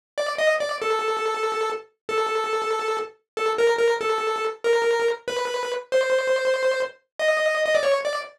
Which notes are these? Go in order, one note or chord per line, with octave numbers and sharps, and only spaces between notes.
D5
D#5
D5
A4
A4
A4
A#4
A#4
A4
A#4
B4
C5
D#5
D#5
D5
C#5
D5